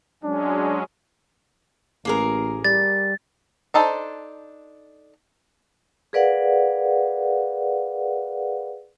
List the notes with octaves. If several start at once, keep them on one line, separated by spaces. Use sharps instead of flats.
F#3 G#3 C#4 D4
A1 A#3 G#4 A#4
G3 A6
D4 D#4 A4 C5
G#4 A#4 B4 D5 F5 F#5